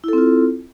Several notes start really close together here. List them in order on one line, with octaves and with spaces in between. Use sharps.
E4 A4 C4 F4